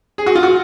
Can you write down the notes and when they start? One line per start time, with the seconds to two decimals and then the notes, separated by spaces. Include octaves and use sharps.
0.18 G#4
0.26 F#4
0.35 F4
0.43 F#4